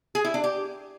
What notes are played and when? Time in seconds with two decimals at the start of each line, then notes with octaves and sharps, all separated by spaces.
0.15 G#4
0.24 E4
0.34 D4
0.44 G4